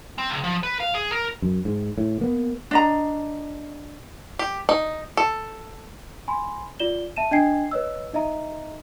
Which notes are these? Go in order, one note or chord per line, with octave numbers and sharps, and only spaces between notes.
C4
C#2
F3
B4
F5
G#4
A#4
F#2
G#2
A2
A#3 B3
D4 D#5 A#5
G4
D#4
A4
G#5 B5 C6
F4 D5 E7 G7
E5 A5 D#7 E7
D4 D#5 G5 G#5 G#6 C7
B4 C#5 D#5 E6
D#4 D#5 E5 A#5